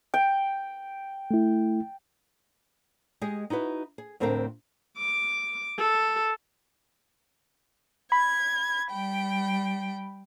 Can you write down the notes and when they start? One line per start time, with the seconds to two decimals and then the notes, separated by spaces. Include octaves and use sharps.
0.14 G5
1.31 A3 E4
3.21 G#3 G4 G#4 D#5
3.50 D#4 E4 F#4 B4
3.98 G#4
4.20 D2 A2 C4 D4 A#4 F5
4.97 D6
5.78 A4
8.12 B5 G#6
8.91 G3 G5